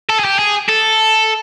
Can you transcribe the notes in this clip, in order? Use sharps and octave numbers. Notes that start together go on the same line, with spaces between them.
A4
G#4
G4
G#4
A4